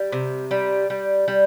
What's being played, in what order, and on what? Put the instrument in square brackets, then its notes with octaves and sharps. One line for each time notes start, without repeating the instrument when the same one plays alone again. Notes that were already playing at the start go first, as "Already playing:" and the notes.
Already playing: [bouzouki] G3
C3
G3
G3
G3